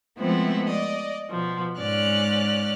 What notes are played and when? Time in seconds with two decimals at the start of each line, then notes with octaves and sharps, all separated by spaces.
0.18 F3 G#3 A3 B3 C4 E4
0.69 D5 D#5
1.31 B2 F3
1.79 G#2 G#3 C#4 D5 F6 F#6